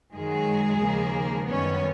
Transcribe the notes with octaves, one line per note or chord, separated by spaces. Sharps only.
F#2 D#3 F#3 G#3 G#4
D#2 C#3 F3 A#3
F#2 D#3 G3 B3 C#4 C#5